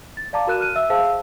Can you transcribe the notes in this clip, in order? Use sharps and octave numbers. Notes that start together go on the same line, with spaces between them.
A6
D5 F5 A5 A#5 D6
F#4 A#4 F#6 D#7 E7
F6 F#6 D#7
E5 E6
G#4 C5 F5 A5 E6